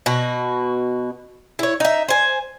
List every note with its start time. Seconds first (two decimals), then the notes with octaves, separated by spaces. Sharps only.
0.06 B2 F#4
1.59 E4 C#5
1.80 D#4 E5
2.08 C5 G#5